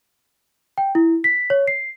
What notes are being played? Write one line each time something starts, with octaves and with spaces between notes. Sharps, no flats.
G5
E4
B6
C#5
C7